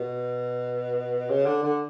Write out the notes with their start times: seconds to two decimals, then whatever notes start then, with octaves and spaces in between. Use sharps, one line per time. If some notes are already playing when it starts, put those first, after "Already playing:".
Already playing: B2
1.29 C#3
1.46 D3
1.63 D3